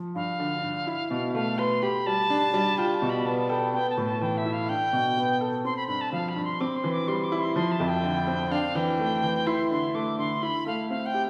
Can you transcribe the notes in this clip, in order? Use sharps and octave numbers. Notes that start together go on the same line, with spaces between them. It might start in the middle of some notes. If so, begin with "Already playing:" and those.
Already playing: F3
G2 F5
D3
G2
E4
B2
A3 F5
B4 C6
G4 B5
G3 A5
D4
G3
F4 G5
A5
B2
B5
B3 A5
A4 G5
B3 G5
A5
A2
A5
E3 G5
E5
E4
F5
D4 G5
B2
B3
A4
C4 C6
B5
G2 B5
A5
F3 F5
B5
G2
C6
C4 D6
C6
E3
D6
G3 C6
D6
E4
C6
F3 C6
A5
F2
G5
D3
C4
D4 F5
E3 G5
A3
E3
E4 C6
D3 C6
A3 D6
D3 C6
E4 B5
A3 F5
C4 F5
G5
G4